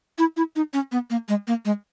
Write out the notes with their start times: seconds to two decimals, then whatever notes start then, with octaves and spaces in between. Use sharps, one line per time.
0.18 E4
0.37 E4
0.56 D#4
0.74 C#4
0.92 B3
1.10 A#3
1.29 G#3
1.48 A#3
1.65 G#3